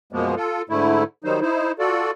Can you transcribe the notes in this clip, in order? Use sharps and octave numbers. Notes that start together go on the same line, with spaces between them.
F#2 B2 F3 G#3 A#3 B3
F4 A4
G#2 D3 A3 E4
D#3 F#3 G3 D#4 C5
D#4 E4 C5
F4 F#4 A4 D5